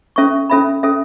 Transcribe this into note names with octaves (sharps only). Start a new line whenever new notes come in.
C#4 A4 E5 C#6
C#4 A4 E5 B5
C#4 A4 E5